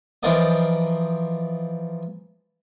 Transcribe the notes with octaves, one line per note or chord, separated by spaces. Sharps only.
E3 F3 F4 A#4 D5 D#5